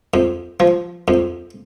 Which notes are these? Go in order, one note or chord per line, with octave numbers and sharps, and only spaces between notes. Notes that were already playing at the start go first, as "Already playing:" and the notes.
F2
F3
F2